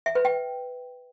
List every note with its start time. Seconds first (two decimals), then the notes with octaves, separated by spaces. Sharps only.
0.06 E5
0.15 B4
0.25 G5